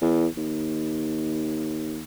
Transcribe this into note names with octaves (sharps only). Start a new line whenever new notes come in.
E2
D#2